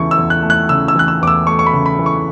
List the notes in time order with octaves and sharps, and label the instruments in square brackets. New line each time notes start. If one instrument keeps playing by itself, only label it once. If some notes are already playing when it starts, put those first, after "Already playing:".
Already playing: [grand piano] E2 C#3 E3 A3 C#6
E6
E2
F#6
A3
F#6
C#3 E6
E6
E3 F#6
E6
E2 D6
E6
A3 C#6
C#6
B5
C#3
B5
E3
C#6